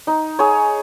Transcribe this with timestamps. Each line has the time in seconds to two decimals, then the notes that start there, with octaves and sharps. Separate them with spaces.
0.07 D#4
0.39 G#4 C#5